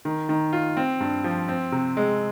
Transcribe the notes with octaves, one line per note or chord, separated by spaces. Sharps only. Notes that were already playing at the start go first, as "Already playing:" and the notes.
D#3
D#3
F4
C4
G2
F3
C4
C3
G#3